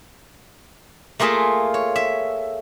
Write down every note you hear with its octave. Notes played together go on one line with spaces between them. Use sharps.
A3 A#3 F4 G#4 A#4 E5
C#5
E5